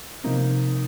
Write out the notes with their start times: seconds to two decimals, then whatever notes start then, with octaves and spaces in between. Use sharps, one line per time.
0.24 C3 F3 A#3 C4 D#4